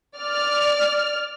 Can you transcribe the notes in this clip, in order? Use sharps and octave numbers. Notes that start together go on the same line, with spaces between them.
D5 F6